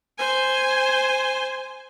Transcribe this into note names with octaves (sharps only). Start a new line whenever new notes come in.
C5 G#5